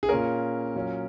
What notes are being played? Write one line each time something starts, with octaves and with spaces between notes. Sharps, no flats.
G#4
A#2 A#3 C#4 A#4
A#2 F#3 C#4